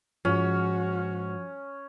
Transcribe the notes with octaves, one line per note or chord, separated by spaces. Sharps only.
G#2 F3 C#4 F#4